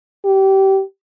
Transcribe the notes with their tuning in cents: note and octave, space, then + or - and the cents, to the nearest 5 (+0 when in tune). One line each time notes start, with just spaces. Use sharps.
G4 -25